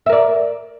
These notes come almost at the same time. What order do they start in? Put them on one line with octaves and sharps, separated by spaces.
E5 A#4 D5